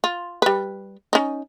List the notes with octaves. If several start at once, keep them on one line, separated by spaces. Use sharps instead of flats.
F4
G3 B4
C#4 D#4